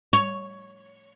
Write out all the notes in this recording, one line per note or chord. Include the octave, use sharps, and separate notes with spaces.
C#5